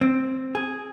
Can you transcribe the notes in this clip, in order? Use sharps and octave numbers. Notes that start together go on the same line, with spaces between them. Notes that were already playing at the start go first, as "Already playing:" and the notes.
C4
G#4